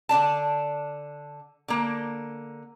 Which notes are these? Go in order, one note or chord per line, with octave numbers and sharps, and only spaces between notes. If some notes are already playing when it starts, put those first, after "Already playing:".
D3 D4 D5 A5
D3 A#3